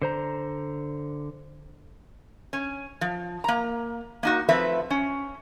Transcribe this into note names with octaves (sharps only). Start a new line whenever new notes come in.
D3 C5 A#5
C#4
F3
A#3 A#5
A#3 D#4 F#4
F3 A3 C4 B4 E5
C#4